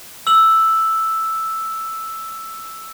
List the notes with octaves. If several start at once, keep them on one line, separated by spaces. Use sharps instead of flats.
E6 F#7